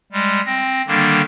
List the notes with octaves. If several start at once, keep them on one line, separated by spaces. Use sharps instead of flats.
G3 G#3
C4 A#6
D3 D#3 G3 A#3 D4